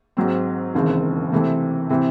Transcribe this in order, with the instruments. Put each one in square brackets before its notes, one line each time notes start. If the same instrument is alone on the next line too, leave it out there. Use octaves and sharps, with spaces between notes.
[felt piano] G#2 F#3 C4
E1 D#2 C#3 E3 C4
C3 E3 A3 C4
C3 E3 C4